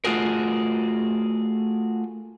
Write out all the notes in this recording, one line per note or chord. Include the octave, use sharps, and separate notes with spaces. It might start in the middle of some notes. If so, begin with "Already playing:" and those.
A3 F4 F#4 G#4 A#4